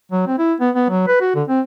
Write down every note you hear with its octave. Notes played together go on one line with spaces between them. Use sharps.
F#3
C4
E4
B3
B3
F#3
B4
F#4
D3
C4